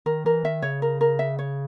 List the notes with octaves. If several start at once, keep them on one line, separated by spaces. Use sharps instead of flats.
D#3 A#4
E3 A#4
D#3 E5
C#3 C#5
A#4
A#4
E5
C#5